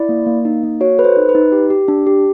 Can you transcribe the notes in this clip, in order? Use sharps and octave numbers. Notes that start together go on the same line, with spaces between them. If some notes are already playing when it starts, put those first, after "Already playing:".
Already playing: E4 D5
A#3
A#3
D#4
A#3
F#4 C#5
A4 B4
C5
D#4
B4
D#4
G4
G4
D4
G4